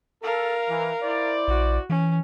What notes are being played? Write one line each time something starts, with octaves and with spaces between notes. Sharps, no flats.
A4 A#4 F5
E3
E4 C5 D5
A#1 F#4
E3 C#4